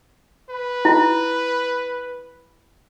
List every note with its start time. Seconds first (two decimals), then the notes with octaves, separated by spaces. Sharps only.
0.50 B4
0.85 E4